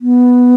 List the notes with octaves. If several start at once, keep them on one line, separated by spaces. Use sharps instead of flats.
B3